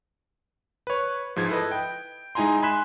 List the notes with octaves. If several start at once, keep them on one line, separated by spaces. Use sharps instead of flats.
B4 C#5
G#2 F3 G#3 G#6
E4 A4 B4 D#5
G5
G#3 D#4 E4 G#5 A#5 C6
G#5 B5 C6 F#6 B6 E7